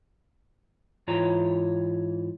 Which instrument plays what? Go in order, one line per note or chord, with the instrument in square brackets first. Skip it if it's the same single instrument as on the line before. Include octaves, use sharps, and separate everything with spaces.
[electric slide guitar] G#2 E3 F4 C#5 A#5